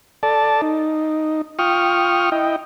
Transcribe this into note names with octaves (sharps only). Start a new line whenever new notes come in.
A4 D5 A5
D#4
F4 G5 C#6 D#6 F6
E4 D#5 G5